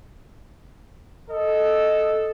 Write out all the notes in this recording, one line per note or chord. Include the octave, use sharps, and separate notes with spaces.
A4 D#5